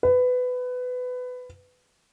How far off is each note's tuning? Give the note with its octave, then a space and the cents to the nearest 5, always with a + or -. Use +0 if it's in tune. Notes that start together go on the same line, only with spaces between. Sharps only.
B4 +20